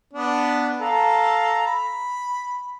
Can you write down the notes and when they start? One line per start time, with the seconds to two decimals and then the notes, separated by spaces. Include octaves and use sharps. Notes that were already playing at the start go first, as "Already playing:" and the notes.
0.13 B3 D4
0.81 A4 F5 A#5
1.67 B5